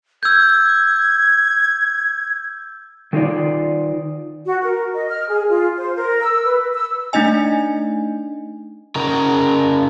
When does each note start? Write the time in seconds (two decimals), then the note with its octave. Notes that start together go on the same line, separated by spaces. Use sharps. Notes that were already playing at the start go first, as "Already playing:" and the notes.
0.23 E6 G6 G#6
3.13 D#3 D#4 F4 D5
4.45 F#4
4.62 A#4
4.93 D#5
5.09 F6
5.29 G#4
5.49 F4
5.77 C5
5.96 A#4
6.21 E6
6.45 B4
6.73 E6
7.13 A3 D4 D#4 D#5 G#5
8.96 C#3 A#4